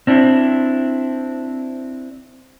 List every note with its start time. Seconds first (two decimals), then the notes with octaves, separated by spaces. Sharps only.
0.07 C4 D4 E4